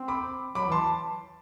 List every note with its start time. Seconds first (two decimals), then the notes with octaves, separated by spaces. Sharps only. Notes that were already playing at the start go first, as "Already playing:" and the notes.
Already playing: C4
0.08 B5 D6
0.55 F#3 B5 D6
0.68 E3
0.72 A5 C6